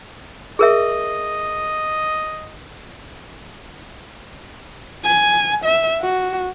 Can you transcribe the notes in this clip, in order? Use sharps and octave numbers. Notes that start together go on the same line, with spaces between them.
G#4 A#4 D#5 E5
G#5
E5
F#4